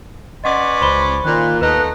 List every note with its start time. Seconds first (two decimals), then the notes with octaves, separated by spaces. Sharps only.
0.44 C#4 B4 D5 D#5 F#5 C6
0.81 C#2 C5 B5 G7
1.25 A#2 D#3 F#6
1.61 D#2 A3 B3 D#4 B4 F#6